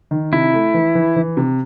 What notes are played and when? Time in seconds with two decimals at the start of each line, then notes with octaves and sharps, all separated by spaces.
0.11 D#3
0.33 C3 E4
0.54 A3
0.74 E3
0.95 E3
1.16 E3
1.37 C3